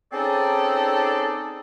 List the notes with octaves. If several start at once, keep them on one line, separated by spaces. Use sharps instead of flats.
C4 C#4 D#4 G#4 A4 D5